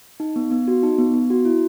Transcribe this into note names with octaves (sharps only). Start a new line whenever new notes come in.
D#4
B3
B3
F#4
D#4
B3
B3
F#4
E4